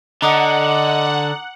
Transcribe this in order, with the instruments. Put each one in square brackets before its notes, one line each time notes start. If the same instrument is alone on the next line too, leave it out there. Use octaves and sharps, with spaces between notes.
[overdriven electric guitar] D3 [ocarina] D#5 [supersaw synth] F#5 [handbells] A#5 D6 D#6